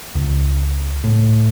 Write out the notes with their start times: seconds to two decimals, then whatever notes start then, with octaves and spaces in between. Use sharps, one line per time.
0.15 C#2
1.04 A2